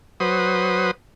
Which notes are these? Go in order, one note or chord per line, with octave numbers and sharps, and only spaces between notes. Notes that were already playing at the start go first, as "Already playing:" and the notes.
F#3 B4 C5 D#6